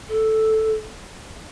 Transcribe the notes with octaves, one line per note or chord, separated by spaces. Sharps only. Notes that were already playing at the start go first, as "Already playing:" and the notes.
A4